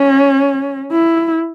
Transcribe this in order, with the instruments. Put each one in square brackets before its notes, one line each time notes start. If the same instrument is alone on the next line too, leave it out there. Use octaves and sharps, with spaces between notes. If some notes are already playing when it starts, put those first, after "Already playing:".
Already playing: [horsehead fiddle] C#4
E4